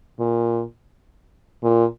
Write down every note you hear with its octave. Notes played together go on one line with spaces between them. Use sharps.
A#2
A#2